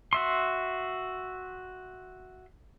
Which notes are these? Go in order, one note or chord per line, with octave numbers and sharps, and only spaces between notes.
F#4 E5 C6